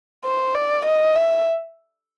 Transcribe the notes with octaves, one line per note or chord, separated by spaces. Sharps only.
C5
D5
D#5
E5